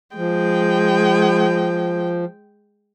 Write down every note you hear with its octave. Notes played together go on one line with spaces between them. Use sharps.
F3 G#3 G5